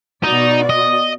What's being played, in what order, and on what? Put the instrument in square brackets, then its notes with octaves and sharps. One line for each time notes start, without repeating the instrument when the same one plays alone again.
[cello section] B2 F#4 D5 [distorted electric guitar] D#4
[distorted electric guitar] D#5